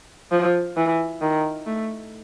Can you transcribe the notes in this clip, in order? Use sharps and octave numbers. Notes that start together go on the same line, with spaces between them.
F3
E3
D#3
A3